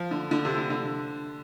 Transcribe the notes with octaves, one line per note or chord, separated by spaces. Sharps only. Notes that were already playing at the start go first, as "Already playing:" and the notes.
Already playing: F3
D3
D3
C3
D3
D3